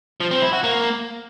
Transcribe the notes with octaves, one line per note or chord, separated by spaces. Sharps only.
F3
C4
E4
F#4
A#3